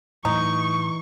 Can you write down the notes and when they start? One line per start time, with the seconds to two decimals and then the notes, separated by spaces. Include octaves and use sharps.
0.25 A2 E3 F#3 A3 D#4 C#6